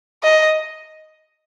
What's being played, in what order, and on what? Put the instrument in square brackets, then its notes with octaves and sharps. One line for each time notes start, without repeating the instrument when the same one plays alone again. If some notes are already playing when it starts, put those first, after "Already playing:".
[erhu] D#5